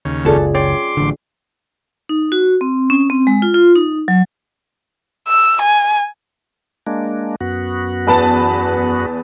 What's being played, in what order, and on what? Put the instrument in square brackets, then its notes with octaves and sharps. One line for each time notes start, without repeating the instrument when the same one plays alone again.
[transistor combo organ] D#2 C#3
[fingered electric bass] F#1 C#2 [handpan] F4 G#4 D5 [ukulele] A4 B4 A5
[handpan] C#4 [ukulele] C#5 D5 G5 [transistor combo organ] C6 D6
[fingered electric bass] A1 D3
[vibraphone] D#4
F#4
C4
C#4
C4
G#3
F4
F4
D#4
F#3
[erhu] E6
G#5
[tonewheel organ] G#3 A#3 D4
F#2 B3 F#4
[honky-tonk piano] E2 B4 A5